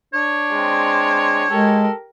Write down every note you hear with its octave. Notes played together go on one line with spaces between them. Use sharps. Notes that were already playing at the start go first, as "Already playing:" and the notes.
D4 C#5
G#3 C4
G#3 G4 A4 A#4